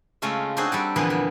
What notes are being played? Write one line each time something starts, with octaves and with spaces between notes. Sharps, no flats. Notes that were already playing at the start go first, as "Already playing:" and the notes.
C#3 G#3 A3 C#4 F4 E5
C4 D4 D#4 F#4 G#4 C5
G3 A4 D5
F2 A#2 D3 E3 B3 G#4
G3